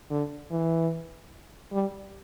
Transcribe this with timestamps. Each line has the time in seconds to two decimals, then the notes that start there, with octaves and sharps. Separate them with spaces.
0.10 D3
0.51 E3
1.72 G3